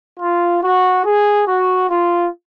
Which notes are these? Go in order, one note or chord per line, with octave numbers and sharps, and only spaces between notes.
F4
F#4
G#4
F#4
F4